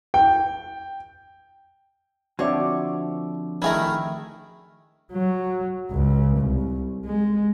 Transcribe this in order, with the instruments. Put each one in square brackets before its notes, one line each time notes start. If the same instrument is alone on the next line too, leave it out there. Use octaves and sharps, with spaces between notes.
[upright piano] G5
[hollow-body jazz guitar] D3 F3 C4 [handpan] F#4 D5 E5 [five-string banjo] C#5
[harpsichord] D#3 A3 [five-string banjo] E4 G#4 A#4
[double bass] F#3
C#2
C2
G#3